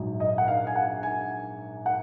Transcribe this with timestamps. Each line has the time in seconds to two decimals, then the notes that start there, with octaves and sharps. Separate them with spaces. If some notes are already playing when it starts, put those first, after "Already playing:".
Already playing: A#1 G#2 F#3
0.20 D#5
0.38 F#5
0.48 F5
0.67 G#5
0.76 F#5
1.03 G#5
1.86 F#5